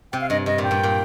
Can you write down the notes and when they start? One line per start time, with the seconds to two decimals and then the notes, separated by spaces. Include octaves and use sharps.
0.13 C3 G5
0.21 F5
0.30 G2 D#5
0.46 G2 D#5
0.58 A#2 G5
0.71 G2
0.83 A#2